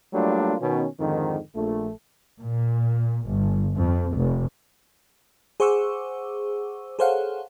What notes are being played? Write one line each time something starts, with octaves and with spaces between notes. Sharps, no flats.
F#3 G3 A3 A#3 D4 F4
B2 D#3 C#4
F2 G#2 D3 D#3
A#1 A3
A#2
G1
F2
F1
G#4 C5 F#5 C#6 D6 E6
G#4 A4 C5 C#5 F5 F#5